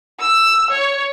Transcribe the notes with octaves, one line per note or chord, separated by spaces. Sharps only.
E6
C#5